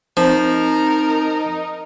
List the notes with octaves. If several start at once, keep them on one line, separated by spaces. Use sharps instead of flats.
F3 C4 D#4 A#4